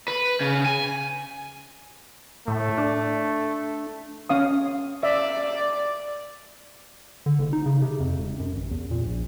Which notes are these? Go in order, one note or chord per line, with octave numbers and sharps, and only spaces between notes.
B4
C#3
G#5
A2 A3
D4
C#4 F5 D#6
D5 E5
D3
F#1
D#4
C#3
C3
F2
E1
F#2
A1
E2
A#2
A#1